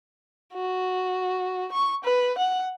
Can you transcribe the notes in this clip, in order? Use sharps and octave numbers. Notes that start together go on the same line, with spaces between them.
F#4
C#6
B4
F#5